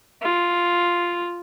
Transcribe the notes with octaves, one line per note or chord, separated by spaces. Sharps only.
F4